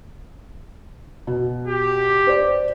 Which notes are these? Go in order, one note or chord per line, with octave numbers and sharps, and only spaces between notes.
B2
G4
C5 D5